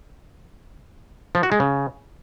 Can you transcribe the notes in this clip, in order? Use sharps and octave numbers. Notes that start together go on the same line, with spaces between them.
F3
F#4
G#3
C#3